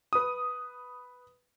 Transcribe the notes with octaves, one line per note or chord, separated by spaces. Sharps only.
B4 D#6